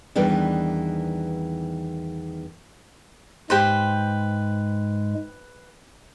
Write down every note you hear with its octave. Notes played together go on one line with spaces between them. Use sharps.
E2 D#3 E3 G3 B3 D4
G#2 G#3 G4 B4 C5